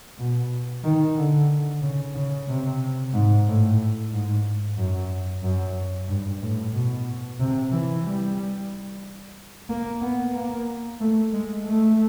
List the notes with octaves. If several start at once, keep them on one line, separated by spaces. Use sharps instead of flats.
B2
D#3
D3
C#3
C#3
C3
G#2
A2
G#2
F#2
F#2
G2
A2
B2
C3
E3
G3
A#3
B3
A#3
A3
G#3
A3